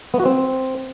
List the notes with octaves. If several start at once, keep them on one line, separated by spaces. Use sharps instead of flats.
B3
F#4
C4